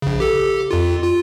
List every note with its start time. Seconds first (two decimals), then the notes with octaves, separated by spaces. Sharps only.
0.02 A#1 C#3
0.20 G4 A4
0.71 F2 F4
1.04 F4